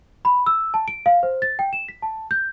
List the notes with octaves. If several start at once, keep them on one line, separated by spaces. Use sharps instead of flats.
B5
E6
A5
D7
F5
C5
A6
G5
E7
B6
A5
G6